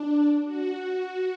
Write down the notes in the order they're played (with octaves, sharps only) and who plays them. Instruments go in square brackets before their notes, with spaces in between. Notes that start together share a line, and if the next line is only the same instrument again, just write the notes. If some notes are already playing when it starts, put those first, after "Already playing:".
Already playing: [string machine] D4
F#4